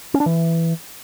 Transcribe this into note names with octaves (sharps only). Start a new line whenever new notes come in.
C#4
D4
E3